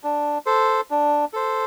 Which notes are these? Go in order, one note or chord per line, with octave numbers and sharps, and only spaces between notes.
D4
A4 C5
D4
A4 C5